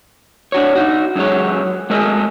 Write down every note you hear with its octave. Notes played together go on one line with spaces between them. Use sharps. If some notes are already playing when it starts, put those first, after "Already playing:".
D4 F#4 C#5
D#4 F#4
F#2 F#3 G#3 C#5
G#3 A3 G#4 A#4 D#5